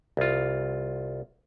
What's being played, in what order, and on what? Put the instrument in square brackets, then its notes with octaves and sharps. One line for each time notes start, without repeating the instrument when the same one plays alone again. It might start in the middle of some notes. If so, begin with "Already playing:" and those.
[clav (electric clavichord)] C2 F4